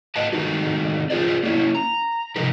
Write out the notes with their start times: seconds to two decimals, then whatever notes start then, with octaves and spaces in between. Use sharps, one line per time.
0.16 B4 D#5 F5 A5
0.33 D#3 A3 C4 D#4 F#4
1.10 C#4 F4 G#4 C5 D5
1.43 A#3 C#4 D#4 E4
1.75 A#5
2.36 C3 F3 D#4 A#4 B4